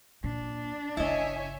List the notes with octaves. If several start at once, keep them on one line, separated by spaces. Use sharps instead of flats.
A#2 D4
G1 C#3 E4 C#5 D#5 E5 G#5